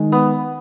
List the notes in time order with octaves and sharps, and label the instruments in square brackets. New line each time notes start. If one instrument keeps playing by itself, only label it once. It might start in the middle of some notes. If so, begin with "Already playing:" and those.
Already playing: [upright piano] D#3 G#3 D#4
[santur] B3